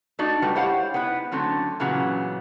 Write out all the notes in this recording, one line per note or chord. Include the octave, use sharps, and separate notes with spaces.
A3 D4 D#4 F#4 D5
G3 A3 F#4 B4
E4 G4 C5 C#5 F5 F#5
B3 D#4 E4 B4
D3 F#3 A3 C4 C#4
A#2 C#3 E3 F#3 B3